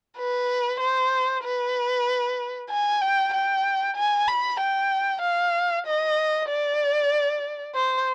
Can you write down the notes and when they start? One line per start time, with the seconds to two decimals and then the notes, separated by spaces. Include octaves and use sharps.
0.18 B4
0.81 C5
1.44 B4
2.70 G#5
3.02 G5
3.34 G5
3.97 G#5
4.28 B5
4.60 G5
5.23 F5
5.86 D#5
6.49 D5
7.76 C5